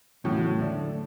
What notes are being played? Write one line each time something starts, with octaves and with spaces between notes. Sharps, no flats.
E2 A2 C#3 F#3
D3 A3 D4